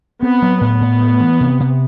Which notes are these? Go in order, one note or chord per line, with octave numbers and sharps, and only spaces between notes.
B3 C4
F#3
A2 B3
A2
A3
E3
C3
C3